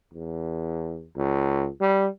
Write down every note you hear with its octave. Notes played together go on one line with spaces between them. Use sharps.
E2
C#2
G3